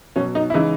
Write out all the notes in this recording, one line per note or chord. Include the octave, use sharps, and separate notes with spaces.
B2 F#3 C#4
D#4
E4
C#3 E3 G#3 D#4